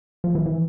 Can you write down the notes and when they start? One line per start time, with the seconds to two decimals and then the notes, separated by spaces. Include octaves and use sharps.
0.24 F3
0.35 E3
0.46 E3